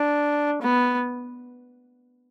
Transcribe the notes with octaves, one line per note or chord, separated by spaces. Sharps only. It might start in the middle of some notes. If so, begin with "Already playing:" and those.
Already playing: D4
B3